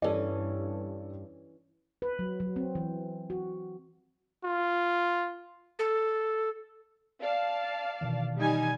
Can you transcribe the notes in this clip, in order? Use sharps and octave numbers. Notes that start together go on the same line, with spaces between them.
G2 E3 C#4 A4 D5
B4
F#3
F#3
C4
E3
F#4
F4
A4
D5 F5 A5
B2 D#3 E3
G3 D#4 G#5